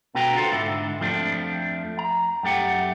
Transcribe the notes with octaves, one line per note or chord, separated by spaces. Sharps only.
B2 D3 F#4 B4 G5 A#5
F4 F#4 A4 C5
G#2 D3 E4
F2 F3 A3 D4
A#5
F#2 A3 G4 F#5